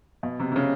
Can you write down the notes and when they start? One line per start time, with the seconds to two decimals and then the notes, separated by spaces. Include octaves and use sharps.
0.23 B2
0.40 C3
0.52 C3
0.56 C#3